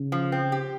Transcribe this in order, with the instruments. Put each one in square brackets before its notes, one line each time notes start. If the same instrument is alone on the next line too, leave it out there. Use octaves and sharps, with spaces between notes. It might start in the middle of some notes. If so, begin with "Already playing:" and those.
Already playing: [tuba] C#3
[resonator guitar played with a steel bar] F3
C4
G4